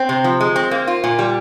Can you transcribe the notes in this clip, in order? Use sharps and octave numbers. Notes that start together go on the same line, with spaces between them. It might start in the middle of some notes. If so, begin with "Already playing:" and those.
Already playing: C4
C3
F3
G#3
C4
A#3
F4
A#2
G3